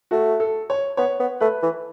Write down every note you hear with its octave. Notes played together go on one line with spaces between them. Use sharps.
A3 F#4
A4
C#5
B3 C#5
B3
A3 B4
E3